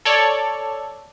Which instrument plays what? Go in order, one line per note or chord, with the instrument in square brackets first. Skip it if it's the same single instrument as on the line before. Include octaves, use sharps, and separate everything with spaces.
[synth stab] A4 C#5 D5